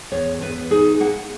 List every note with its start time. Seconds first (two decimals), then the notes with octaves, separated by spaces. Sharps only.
0.12 E2 C#5
0.41 E2 B4
0.71 D#4 G#4
1.00 A#3 F#5